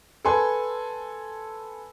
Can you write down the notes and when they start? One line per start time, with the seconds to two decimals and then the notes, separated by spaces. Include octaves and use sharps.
0.25 A4 B4 G#5 C6